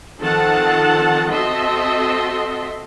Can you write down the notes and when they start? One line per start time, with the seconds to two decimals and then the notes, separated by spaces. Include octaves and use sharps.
0.19 D#3 F3 C4 A4 F#5 A5
1.30 C4 F#4 A4 D#5 E5 C6